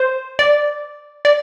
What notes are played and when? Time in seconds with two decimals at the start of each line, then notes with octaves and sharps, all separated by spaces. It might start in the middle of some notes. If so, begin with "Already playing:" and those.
Already playing: C5
0.39 D5
1.25 D5